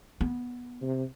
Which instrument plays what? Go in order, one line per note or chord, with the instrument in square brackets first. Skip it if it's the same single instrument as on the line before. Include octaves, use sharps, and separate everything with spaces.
[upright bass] B3
[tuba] C3